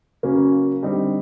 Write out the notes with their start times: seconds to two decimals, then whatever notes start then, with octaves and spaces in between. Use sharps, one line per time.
0.23 C#3 F#3 A#3 C#4
0.83 D3 G3 C4 D#4